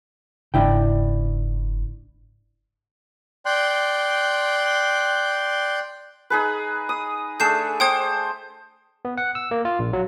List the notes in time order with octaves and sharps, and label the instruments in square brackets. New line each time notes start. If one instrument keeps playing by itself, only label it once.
[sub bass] F#1 [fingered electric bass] G#2 C#3 [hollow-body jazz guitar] D4 E4 G5
[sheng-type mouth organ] D5 G5 C6 F#6
[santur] D#4 G#4 B4
D#6
[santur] A3 D4 G#4 [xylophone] G6 C7 E7
[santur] C5 [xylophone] G5 D#6 G#6
[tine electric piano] B3
F#5
E6
A#3
F4
A#1
F#3